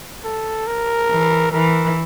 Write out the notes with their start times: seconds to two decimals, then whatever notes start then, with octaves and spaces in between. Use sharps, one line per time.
0.25 A4
0.67 A#4
1.10 E3
1.52 E3 A#4